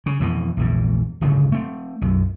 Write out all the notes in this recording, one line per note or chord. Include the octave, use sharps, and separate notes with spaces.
C#3
F2 B2 E3
A#1 E2 G#2
D1 G1 G#2 C#3
A3 C4
B1 F#2